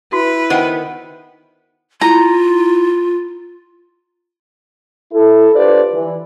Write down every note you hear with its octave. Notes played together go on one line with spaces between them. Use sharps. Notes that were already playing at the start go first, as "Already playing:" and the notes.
E4 F#4 B4
D#3 B3 C5 F#5 G5
E4 F4 A#5
E4 A4
D4 F4 G4 B4 C5 D5
E3